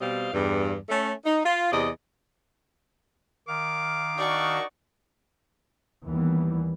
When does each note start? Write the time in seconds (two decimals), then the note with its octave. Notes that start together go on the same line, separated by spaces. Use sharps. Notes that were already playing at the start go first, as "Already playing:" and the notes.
0.01 B2 G3 C4 D#5 F5
0.33 E2 G2
0.89 A3 C#4
1.25 D#4
1.45 F4
1.72 E2 C3 D5 D#5
3.48 D#3 F5 D6
4.18 D4 D#4 F#4 D5 C#6
6.05 D#2 E3 G3 B3